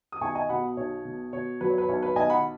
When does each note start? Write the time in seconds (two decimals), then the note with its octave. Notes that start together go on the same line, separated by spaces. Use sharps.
0.12 D#6
0.21 B1 G#5 C#6
0.35 D#5 G#5
0.49 B2 F#5 B5
0.77 B1 C#5
1.05 B2
1.33 B2 C#5
1.61 F#3 B4
1.70 C#5
1.78 B4
1.88 B1 C#5
2.03 B4
2.16 B1 D#5 G#5
2.30 F#5 B5